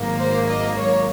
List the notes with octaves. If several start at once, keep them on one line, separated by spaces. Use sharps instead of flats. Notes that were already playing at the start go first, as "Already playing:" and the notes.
Already playing: G#1 G#2 F#3 A#3
C5
D#5
C#5